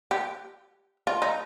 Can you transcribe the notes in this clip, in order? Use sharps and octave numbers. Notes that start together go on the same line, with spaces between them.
G4
F4
D#4